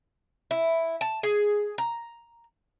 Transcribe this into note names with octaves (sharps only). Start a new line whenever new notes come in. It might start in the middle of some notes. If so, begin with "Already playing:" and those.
E4
A5
G#4
A#5